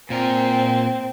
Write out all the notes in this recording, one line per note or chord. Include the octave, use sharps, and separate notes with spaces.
A#2 C4 A#4